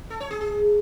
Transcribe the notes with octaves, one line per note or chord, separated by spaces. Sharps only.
A4
C#5
G#4
G#4